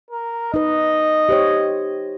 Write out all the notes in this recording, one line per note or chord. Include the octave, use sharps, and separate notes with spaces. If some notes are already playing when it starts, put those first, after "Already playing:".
A#4
D#4 B4 D#5
G4 C5 C#5